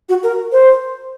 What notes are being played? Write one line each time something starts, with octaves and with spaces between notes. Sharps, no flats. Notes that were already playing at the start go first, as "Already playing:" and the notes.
F#4
A#4
C5